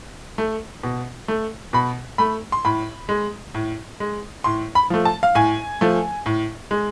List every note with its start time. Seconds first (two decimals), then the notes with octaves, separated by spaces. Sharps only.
0.38 A3
0.83 B2
1.28 A3
1.73 B2 B5
2.18 A3 B5
2.52 C6
2.65 A2 B5
3.09 G#3
3.55 A2
4.00 G#3
4.44 A2 C6
4.75 B5
4.90 F3 A3
5.05 A5
5.23 F5
5.35 A2 G#5
5.81 F3 A3
6.26 A2
6.71 G#3